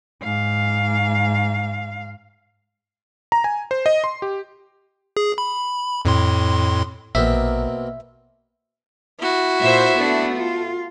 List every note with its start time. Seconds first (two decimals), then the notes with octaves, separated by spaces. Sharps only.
0.23 G#2 F5
3.32 A#5
3.44 G#5
3.71 C5
3.86 D#5
4.04 C6
4.22 G4
5.17 G#4
5.38 B5
6.05 F2 A2 C6
7.15 A#1 B2 A#3 C4 E5
9.20 E4 F#4
9.61 A#2 C5 E5
9.98 A3 B3 D4
10.36 F4